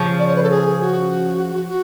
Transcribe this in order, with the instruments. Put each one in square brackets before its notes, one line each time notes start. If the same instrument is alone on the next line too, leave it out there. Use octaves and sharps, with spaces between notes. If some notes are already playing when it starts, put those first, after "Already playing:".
Already playing: [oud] C#3 F3
[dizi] D5
C#5
B4
A4
G#4
F#4
F#4